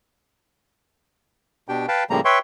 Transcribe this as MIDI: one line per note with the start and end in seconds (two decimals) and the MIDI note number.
1.69 1.86 47
1.69 1.86 62
1.69 1.86 67
1.69 1.86 79
1.88 2.04 71
1.88 2.04 77
1.88 2.04 79
1.88 2.04 81
2.10 2.21 45
2.10 2.21 49
2.10 2.21 53
2.10 2.21 55
2.10 2.21 58
2.10 2.21 82
2.25 2.39 71
2.25 2.39 73
2.25 2.39 76
2.25 2.39 79
2.25 2.39 84
2.25 2.39 85